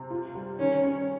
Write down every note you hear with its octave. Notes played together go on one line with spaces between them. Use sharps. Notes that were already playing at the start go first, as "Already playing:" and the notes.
Already playing: C3
F4
G3
D#3 C#4
C#4